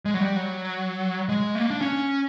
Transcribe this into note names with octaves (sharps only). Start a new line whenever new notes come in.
G#3
F#3
G3
F#3
G#3
A3
A#3
D4
C#4